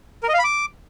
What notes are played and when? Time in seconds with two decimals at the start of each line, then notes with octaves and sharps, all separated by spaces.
0.23 A#4
0.28 D#5
0.34 F5
0.39 B5
0.44 D6